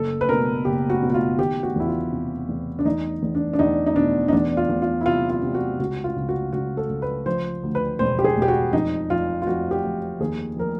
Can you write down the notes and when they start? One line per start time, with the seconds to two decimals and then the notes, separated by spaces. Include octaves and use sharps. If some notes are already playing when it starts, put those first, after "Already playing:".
Already playing: F#1 A4
0.21 B4
0.29 B2 A#4
0.65 F#1 G4
0.90 F#4
1.02 B2
1.10 F#4
1.14 F4
1.38 D#3 G4
1.63 F#4
1.76 E2 E4
1.88 F4
2.12 C3
2.48 E2
2.79 D4
2.85 E2 D#4
3.22 E2
3.35 D4
3.53 D4
3.59 E2 D#4
3.86 D#4
3.95 B2 D4
4.28 D#4
4.33 E2 D4
4.57 F4
4.69 E2
4.82 F4
5.01 E4
5.06 C3 F4
5.30 F4
5.42 C3
5.54 F#4
5.80 C#2 F#4
6.04 F4
6.16 C#2
6.29 F#4
6.53 C#2 F#4
6.77 A4
6.89 C#2
7.02 B4
7.26 F3 C5
7.63 D2
7.75 B4
7.99 E1 C5
8.19 G4
8.24 G#4
8.37 E1
8.42 G4
8.48 F#4
8.73 F2 D#4
9.10 F2 F4
9.42 F4
9.47 F2 F#4
9.71 G4
9.83 F2
10.20 D#2 G#4
10.56 F3 A#4